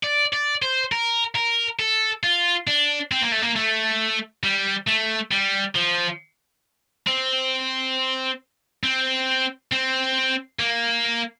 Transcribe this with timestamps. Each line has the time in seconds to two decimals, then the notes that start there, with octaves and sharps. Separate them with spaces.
0.03 D5
0.33 D5
0.62 C5
0.92 A#4
1.36 A#4
1.80 A4
2.24 F4
2.67 D4
3.11 C4
3.22 A#3
3.32 A3
3.42 A#3
3.56 A3
4.44 G3
4.88 A3
5.32 G3
5.75 F3
7.07 C4
8.84 C4
9.72 C4
10.60 A#3